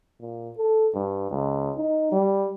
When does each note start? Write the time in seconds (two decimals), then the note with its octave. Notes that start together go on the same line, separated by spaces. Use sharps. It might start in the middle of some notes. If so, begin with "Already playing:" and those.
0.21 A#2
0.57 A4
0.94 G2
1.31 C#2
1.77 D#4
2.12 G3